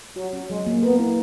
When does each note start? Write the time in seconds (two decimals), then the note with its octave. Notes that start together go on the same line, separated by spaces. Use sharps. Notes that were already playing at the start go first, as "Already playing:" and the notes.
0.16 F#3 F#4
0.33 C#4
0.50 F#3 G#3
0.66 A#3
0.83 B3 A#4
0.99 E4